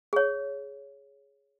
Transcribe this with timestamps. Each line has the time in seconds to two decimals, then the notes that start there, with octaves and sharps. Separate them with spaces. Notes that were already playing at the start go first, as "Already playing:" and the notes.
0.13 G#4 C#5